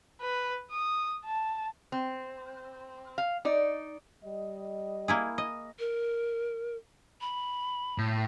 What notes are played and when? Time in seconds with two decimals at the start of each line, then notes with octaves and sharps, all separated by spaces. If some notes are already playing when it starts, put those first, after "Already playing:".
0.21 B4
0.71 D#6
1.25 A5
1.92 C4
3.18 F5
3.45 D#4 D5
4.24 G3 D#5
5.08 A#3 E4 G#4
5.38 D#5
5.79 A#4
7.21 B5
7.98 A2